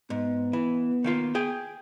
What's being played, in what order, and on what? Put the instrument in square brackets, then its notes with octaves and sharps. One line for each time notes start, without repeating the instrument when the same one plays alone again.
[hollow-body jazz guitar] G#2 [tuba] B3
[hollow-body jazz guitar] E3
D#3 A#3 F4
G#4 G5